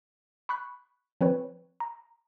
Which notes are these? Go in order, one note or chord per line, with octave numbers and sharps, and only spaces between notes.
B5 C#6 F#6 B6
F3 C4 B4 C#5
A#5